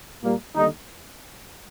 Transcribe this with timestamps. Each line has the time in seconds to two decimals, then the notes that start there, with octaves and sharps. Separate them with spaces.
0.22 A#2 G3 A#3
0.56 D#2 D3 G3 D#4